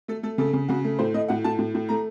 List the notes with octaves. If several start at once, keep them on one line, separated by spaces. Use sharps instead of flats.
A3 A4
A3 A4
C#3 A4
C#3
C#3 F#4
A3
A2 C5
A3 D#5
A2 F#5
A2 A5
A2
A2
A3 A#5